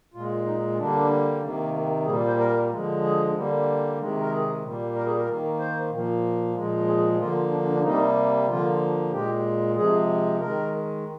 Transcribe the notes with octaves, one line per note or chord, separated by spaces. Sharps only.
A#2 G#3 F4
D#4
D3 G3 A#3 D4
C3 D#3 A#3
A#3
A#2 G3 A#3 G#4
C5
A#4
D3 F3 G#3
G#4
D3 G3 A#3
C3 D#3 G#3
A#4
G#4
A#2 G3 A#3
A#4
G#4
A#4
D#3 A#3
C5
A#2 F3 A#3
A#2 F3 G#3
G#4
G#4
D3 F3 A#3 F4
D4
D4
D4
C3 G3 A#3 D#4
D3 F3 A#3 F4
A#2 G#3 G4
C3 F3 G#3 G#4
D#3 G#3 A#4